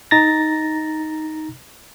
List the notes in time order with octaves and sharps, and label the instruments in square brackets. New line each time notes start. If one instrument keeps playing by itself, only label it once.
[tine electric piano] D#4 A#5 A6 A#6